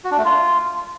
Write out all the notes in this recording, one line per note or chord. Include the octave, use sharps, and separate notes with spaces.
F#4
D4
A3
F4